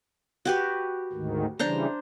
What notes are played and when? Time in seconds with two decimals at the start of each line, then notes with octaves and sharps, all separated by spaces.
0.45 F#4 G4 B4
1.13 D2 G#2 D#3
1.59 C#3 E3 G3 D4 C5 A#5